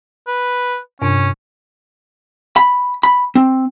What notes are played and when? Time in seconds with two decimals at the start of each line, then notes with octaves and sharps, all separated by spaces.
0.27 B4
1.02 G2 C3 C#4 D4
2.56 B5
3.03 B5
3.35 C4